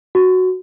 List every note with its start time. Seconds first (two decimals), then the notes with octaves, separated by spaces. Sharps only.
0.15 F#4